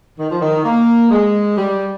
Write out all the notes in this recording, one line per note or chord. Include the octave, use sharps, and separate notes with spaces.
D#3
F3
D#3
A#3
G#3
G3